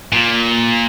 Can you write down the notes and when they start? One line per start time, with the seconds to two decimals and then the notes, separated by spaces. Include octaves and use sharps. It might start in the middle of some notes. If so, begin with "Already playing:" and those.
0.12 A#2